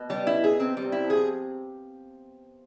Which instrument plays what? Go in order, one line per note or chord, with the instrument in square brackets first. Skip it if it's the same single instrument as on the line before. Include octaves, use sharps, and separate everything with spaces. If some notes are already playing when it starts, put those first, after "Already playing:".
Already playing: [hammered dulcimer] B2
[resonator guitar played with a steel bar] G3
E4
G#4
[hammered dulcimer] C3 [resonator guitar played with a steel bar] C4
[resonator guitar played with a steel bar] G3
[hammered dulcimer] C3
[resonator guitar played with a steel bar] E4
[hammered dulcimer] F3
[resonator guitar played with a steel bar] G#4